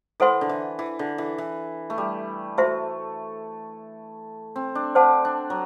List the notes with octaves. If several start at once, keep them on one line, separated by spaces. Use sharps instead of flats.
E3 A4 C5 F#5 C6
D3
E3
E3
D3
E3
E3
A3
G3
A3 F#4 C5 E5
C4
D4
D4 C5 F#5 A5
D4
F#3